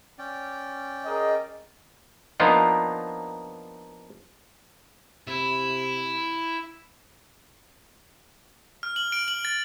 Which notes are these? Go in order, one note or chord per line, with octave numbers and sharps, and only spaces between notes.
C#4 D5 G5
G#4 A#4 D#5
F3 A#3 B3 D4 D#4 F4
C3 E4
F6
F#7
D7
F#7
A6